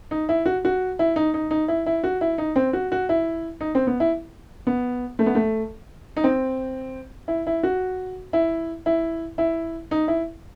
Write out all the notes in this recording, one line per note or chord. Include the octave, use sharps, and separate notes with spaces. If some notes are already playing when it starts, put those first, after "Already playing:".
D#4
E4
F#4
F#4
E4
D#4
D#4
D#4
E4
E4
F#4
E4
D#4
C4
F#4
F#4
E4
D#4
C4
B3
E4
B3
A3
B3
A3
D#4
C4
E4
E4
F#4
E4
E4
E4
D#4
E4